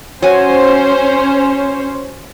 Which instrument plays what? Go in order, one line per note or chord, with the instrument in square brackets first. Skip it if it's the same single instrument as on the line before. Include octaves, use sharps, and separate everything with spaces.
[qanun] F#3 G#5 [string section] C#4 C5 C#5